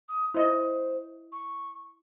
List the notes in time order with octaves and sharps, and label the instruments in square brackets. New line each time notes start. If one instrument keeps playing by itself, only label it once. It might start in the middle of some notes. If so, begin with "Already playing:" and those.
[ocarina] D#6
[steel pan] E4 D#5 [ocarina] C5
[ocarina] C#6